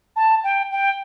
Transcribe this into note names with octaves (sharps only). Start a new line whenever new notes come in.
A5
G5
G5